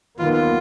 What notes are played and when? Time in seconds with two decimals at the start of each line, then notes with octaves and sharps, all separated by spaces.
0.19 D#2 D#3 F#3 B3 F4
0.33 F4